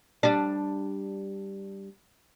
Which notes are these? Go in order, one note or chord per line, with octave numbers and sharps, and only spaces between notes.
G3 D4